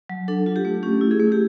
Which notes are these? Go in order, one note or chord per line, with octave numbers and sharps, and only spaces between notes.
F#3
D4 A4
F4
G4
A3
C#4 G4
E4
G#4
A3
G4